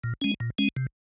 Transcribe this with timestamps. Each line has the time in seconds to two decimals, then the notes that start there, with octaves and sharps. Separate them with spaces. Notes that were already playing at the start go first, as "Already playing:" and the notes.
0.04 A#2
0.22 G#3 C#4
0.40 A#2
0.58 G#3 C#4
0.77 C3